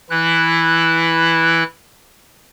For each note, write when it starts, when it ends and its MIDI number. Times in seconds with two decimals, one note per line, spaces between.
0.10 1.63 52
0.10 1.63 64
0.10 1.63 90